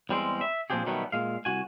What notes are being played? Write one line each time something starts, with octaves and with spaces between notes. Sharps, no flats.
E2 G3 G#3 C4
E5
A#2 F3 C4 D4 G4 G#4
B2 D#3 F#3 G3 A3 B3
A#2 G#3 F5
C2 F#4 G#5